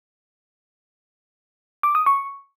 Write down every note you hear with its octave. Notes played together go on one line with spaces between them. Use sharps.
D6
D#6
C#6